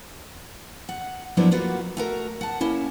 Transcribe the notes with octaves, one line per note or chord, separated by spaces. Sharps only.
F#5
F3 F#3 A#3 B3 D4 E4
A#3 B3 F4 F#4
A3 F#4 A#4
F#5 A5
A#3 C#4 E4